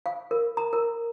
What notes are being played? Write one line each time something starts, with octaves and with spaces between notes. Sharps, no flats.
F5
A#4
A#5
A#4